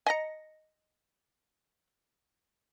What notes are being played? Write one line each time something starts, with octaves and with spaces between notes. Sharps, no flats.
D#5 G#5 A#5 A#6 C#7